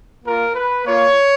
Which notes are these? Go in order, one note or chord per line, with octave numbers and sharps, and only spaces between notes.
A#3 F4 A#4
B4
A#3 F4 C#5